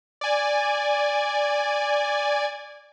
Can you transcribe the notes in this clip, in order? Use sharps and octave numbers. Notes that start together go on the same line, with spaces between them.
D5 G#5